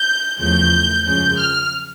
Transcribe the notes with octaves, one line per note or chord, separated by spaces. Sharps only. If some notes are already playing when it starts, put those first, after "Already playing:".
Already playing: G6
E2 C#3 F3 A3 G6
F#2 C#3 F3 G#3 G6
F6